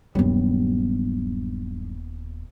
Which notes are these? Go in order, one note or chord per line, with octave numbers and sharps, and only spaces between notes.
D#1 G2 F#3 G3 B3